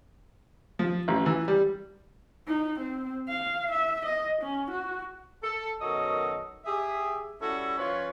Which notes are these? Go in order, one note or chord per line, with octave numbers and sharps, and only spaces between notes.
F3
A1
E3
G3
D#4
C4
F5
E5
D#5
C#4
F#4
A4
F#2 B2 D#3 F#3 A4 D#5
G4 G#4 E5
G3 C#4 E4 F#4 A4
F3 C#4 F4 B4 C#5